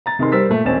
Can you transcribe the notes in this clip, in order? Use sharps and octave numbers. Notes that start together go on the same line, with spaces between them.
A#5 A6
C3 D#3 G#4 A#4 C6
G3 A#4 C5 E6 A6 B6
A#2 A3
E1 B1 C4 C#4 A6 E7